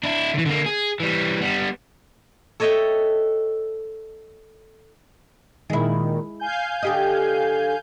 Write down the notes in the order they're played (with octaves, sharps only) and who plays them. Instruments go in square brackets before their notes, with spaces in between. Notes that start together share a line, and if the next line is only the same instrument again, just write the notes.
[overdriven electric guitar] D4 E4
D3 E3
D3 A#3
G#4
E3 G3
G3 B3
[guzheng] A4 C#5 D#5 E5 G5 A5
[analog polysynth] A#2 D#3 [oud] G#3 E4
[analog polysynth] F5 G#5 G6
[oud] D3 G4 D#5